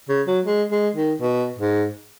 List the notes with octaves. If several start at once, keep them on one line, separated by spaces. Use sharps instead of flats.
C#3
F#3
G#3
G#3
D#3
B2
G#2